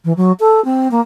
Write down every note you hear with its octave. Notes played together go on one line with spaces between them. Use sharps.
E3
F#3
A4
C4
A#3